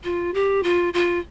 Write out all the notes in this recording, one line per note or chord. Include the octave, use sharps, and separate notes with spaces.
F4
G4
F4
F4